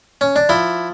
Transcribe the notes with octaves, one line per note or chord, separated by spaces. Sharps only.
C#4
D4
F3 E4